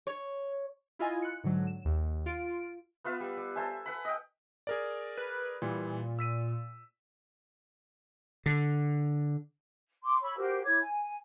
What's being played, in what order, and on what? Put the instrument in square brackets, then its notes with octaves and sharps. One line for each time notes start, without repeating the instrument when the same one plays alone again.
[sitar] C#5
[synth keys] E4 F4 D#5 G#5
F#6 C#7
G#2 D3 F#3
E7
D#2
F4 D7
[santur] B3 F4 B4 E5
G3
G3
A4 C5 E5 G#5
B4 F#5 B5
D#5 G5
[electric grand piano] G#4 A#4 D5
[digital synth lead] B4
[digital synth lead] A#2 [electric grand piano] E3 G3
[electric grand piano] E6 B6 D#7
[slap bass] D3
[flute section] C6 D6
C#5 B5 C#6 E6
F#4 G4 A#4 C5
E4 C#5 D6 G#6
G#5